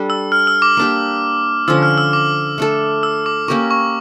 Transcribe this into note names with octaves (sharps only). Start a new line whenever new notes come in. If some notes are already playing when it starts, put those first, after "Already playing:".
Already playing: G3 D4 A4
E6
F6
E6
D6
A#3 D4 G4
D3 F3 C#4 F4 E6
F6
E6
D6
A3 D4 A4
E6
D6
A#3 C#4 G4 A#4 C#6
C#6